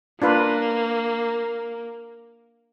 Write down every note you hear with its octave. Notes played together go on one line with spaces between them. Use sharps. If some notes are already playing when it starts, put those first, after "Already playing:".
A#3 D4 F4 B4